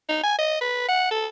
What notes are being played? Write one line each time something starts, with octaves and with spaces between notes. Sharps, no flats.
D#4
G#5
D#5
B4
F#5
A4